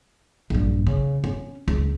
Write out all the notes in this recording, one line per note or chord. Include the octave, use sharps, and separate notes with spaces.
A#1 G2
C#3
C#4
C#2